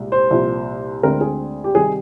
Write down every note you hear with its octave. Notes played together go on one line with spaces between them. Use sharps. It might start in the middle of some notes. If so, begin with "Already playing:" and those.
Already playing: C2 A#2 G#3
C5
C2 A#2 F3
D2 D3 G#3 C4 A#4
G#4
G4
C3 D#3 G3 C4 G#4